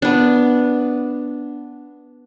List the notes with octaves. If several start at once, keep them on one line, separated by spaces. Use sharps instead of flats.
B3 D4